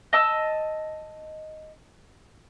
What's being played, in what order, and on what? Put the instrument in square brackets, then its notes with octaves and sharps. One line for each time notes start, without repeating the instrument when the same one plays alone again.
[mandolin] D#5 A5 E6